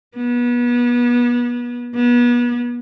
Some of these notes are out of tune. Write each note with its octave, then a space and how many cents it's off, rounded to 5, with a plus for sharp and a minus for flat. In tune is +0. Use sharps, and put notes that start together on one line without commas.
B3 -30
B3 -35